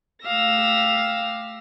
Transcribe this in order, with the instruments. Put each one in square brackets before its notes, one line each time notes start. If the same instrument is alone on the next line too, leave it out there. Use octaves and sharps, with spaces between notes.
[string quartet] A3 G4 F5 E6 A#6